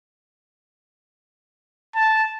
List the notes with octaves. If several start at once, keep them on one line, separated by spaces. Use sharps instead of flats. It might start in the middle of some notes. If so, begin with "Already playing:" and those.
A5